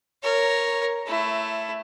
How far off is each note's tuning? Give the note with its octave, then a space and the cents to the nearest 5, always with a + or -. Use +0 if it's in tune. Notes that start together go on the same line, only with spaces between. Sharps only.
A#4 +0 C#5 +0
A3 +0 E4 +15